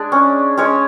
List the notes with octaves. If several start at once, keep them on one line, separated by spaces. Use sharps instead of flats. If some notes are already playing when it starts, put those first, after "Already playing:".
Already playing: G#3 D4 D5
C#4
G#3 C#4 C#5